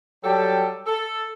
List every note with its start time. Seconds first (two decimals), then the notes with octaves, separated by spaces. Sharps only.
0.24 F#3 G3 G4 A4 G5 A5
0.87 A4